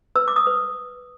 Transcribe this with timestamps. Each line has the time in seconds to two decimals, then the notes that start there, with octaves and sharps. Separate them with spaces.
0.15 B4 E6
0.28 D6
0.36 D#6
0.47 B4